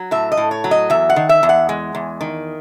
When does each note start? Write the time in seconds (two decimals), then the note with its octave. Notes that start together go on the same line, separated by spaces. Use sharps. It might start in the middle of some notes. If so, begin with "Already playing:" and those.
Already playing: F#3
0.11 A2 E5
0.32 D#5
0.37 A2
0.51 C#5
0.64 F#3
0.71 D#5
0.90 E2 E5
1.10 F#5
1.16 D#3
1.29 E5
1.43 E2
1.49 F#5
1.69 G#3
1.95 E2
2.21 D#3